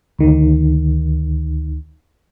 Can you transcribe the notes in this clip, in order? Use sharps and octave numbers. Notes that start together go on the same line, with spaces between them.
D2 D#3